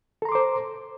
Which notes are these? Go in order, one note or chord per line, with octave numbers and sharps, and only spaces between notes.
A4 C5 A#5 C6 D6